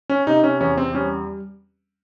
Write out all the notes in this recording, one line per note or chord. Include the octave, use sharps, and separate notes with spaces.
C#4
C3 D#4
C#4
E2 C#4
C4
G3 C#4